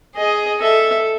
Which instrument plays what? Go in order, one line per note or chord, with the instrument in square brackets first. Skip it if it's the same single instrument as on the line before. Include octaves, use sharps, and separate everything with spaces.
[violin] G#4 [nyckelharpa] D#5
[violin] A4 [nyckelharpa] E5